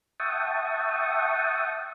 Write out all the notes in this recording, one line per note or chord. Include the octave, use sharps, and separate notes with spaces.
E5 F#5 G5 A5 C#6 D#6